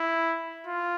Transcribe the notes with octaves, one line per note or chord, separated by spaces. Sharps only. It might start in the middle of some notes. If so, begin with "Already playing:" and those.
Already playing: E4
F4